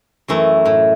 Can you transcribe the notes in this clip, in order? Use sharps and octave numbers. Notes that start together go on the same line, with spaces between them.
F#2 E3 A3 A#5
A2